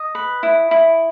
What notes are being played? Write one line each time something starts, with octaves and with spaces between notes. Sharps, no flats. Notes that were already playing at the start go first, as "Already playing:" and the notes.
Already playing: D#5
B4
E4
E4